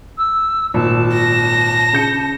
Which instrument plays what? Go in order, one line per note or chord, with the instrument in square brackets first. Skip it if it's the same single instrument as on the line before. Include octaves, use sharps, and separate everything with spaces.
[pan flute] E6
[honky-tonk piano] G#1 [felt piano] A#2 [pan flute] A5
[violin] A#6
[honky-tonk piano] C#3 G6 C#7